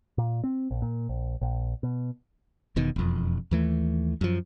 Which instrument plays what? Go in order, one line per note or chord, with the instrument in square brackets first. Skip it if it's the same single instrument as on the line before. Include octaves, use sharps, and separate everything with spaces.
[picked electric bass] A#2
C4
A#1
A#2
A#1
A#1
B2
[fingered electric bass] E1 B2 D#3
E1 F2
D#2 E3 A3
F#2 F3